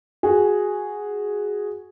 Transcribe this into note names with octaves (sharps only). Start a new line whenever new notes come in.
F#4 G#4